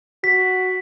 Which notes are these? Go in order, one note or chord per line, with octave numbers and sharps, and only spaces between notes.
F#4 B6